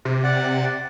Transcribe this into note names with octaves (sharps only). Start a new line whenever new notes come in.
C3
D5 F#5